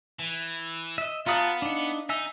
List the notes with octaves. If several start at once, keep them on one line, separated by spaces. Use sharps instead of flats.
E3
D#5 E5
B3 F4 F5 F#5 A5 A#5 D#6
D4 D#4
D#4 E5 G#5 E6